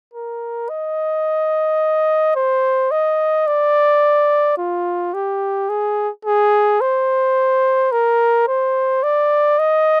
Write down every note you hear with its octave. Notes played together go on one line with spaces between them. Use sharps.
A#4
D#5
C5
D#5
D5
F4
G4
G#4
G#4
C5
A#4
C5
D5
D#5